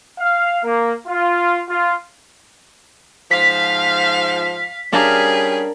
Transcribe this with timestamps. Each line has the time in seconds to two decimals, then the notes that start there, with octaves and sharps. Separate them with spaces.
0.19 F5
0.64 A#3
1.06 F4
1.68 F4
3.31 G#2 F3 F5 B6
4.92 G3 C#4 D4 G#4 A#4 F5